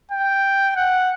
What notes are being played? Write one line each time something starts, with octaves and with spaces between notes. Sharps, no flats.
G5
F#5